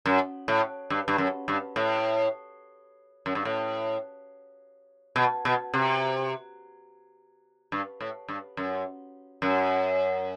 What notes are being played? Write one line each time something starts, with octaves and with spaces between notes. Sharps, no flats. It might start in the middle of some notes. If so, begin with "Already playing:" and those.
F#2
A2
G2
G2
F#2
G2
A2
F#2
G2
A2
B2
B2
C3
G2
A2
G2
F#2
F#2